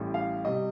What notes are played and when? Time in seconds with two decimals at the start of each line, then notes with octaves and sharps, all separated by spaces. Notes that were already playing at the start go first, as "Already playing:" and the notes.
Already playing: A1 A2 G3
0.14 F5
0.45 C3 G3 D#5